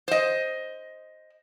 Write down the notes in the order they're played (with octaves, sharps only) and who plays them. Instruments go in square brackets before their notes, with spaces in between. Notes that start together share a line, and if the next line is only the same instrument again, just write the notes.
[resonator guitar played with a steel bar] C5 D#5